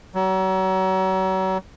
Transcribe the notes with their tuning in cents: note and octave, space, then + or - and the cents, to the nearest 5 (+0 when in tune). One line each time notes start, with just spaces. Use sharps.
F#3 +35